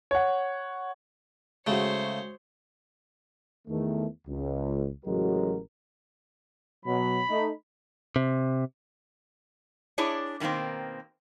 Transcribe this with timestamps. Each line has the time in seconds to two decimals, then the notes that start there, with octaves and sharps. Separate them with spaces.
0.11 C#5 F#5
1.67 C#3 G#3 A3 F#4 C5 C#5
3.68 E2 D#3 A3
4.28 C#2
5.06 A1 C#3 F#3 G#3 F#4 A#4
6.86 B2 F#3 B5
7.30 A3 D#4
8.16 C3
9.98 D4 E4 G#4 C#5 D5
10.40 B2 D#3 G3 A#3 C4